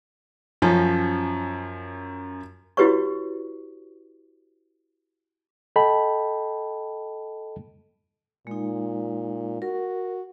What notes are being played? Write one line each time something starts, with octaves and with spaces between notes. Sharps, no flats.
F#2 F3 C#4
E4 F#4 G4 B4 C#5 C#6
A4 D#5 G5 A5 B5
A#2 G#3 D#4
F#4 A#4